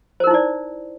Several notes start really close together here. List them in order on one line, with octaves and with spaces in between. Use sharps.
C5 A#4 D#4 E4 D5